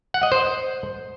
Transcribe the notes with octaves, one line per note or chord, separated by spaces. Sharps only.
F#5
D#5
C5